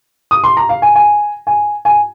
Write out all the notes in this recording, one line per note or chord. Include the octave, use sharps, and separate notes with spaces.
D#6
C6
A#5
F5
G#5
G#5
G#5
G#5